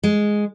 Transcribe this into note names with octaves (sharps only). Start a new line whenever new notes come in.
G#3